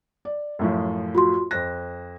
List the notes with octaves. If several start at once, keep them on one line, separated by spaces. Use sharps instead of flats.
D5
F#2 A2 F3
F4 F#4 C6
F2 C5 F#6 A#6